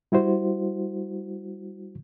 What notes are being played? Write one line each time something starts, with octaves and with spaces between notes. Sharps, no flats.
G3 E4 F#4 C5